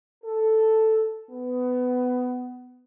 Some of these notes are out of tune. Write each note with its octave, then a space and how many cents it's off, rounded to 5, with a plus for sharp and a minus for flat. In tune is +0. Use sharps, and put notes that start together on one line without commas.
A4 +0
B3 +20